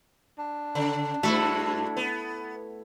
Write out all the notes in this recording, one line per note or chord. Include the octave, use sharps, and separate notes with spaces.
D4
C#3
G2 A3 E4 F#4
B3